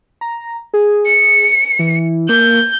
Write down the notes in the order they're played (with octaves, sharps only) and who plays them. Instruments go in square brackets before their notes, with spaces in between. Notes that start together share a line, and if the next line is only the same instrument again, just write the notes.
[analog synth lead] A#5
G#4
[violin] C#7
[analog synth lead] E3
[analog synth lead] A#3 [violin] G6